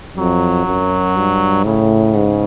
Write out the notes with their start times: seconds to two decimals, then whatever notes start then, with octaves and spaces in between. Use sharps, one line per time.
0.17 F2 F#3
0.66 F#2
1.16 G2
1.65 A2 C#3
2.15 G#2